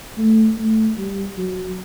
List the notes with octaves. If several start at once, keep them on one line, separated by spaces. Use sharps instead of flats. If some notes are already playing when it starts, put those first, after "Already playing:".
A3
A3
G3
F#3